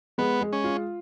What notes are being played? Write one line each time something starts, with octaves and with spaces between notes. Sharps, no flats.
G#3 B3
G#3
C#4
F4